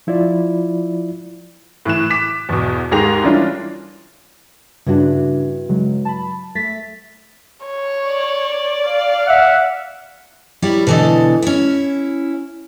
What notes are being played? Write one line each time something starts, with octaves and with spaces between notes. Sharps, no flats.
F3 E4 F4 D5
A2 E3 F#6 E7
D6 B6 E7
E2 B2
D#2 G#2 G4 G#4 A#6 F7
E3 G3 C#4 D4 E4 F4
G2 C#3 D4 E4 F#4
C#3 F#3 G#3
A5 B5
A3 A6 B6
C#5
D5
F5
E5 F#5
F#3 G3 E4
B2 D3 E3 A4 D#5
C#4 E4